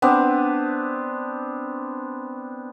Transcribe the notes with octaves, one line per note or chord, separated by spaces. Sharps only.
B3 C4 D4